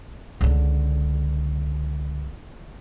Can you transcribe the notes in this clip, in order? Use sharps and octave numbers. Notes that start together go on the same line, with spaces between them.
C#2 D3